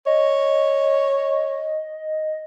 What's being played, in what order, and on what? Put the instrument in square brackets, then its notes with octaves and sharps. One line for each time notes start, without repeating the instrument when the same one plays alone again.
[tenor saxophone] C#5 [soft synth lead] D#5